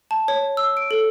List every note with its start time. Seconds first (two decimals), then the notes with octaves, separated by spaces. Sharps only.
0.11 A5
0.28 C#5
0.57 E6
0.77 D7
0.91 A4